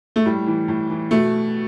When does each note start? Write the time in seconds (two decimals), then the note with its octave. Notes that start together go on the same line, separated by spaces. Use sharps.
0.16 A3
0.26 A2 G3
0.47 E3
0.68 A2
0.90 E3
1.11 B2 A3